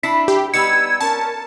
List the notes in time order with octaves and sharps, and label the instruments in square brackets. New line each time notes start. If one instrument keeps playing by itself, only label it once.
[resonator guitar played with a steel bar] D4 E4 [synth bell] B6
[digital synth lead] G4
[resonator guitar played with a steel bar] G3 B3 D#4 [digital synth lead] E6 [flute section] G#6 [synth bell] C#7
[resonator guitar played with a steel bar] C#4 [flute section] A#4 [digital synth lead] A5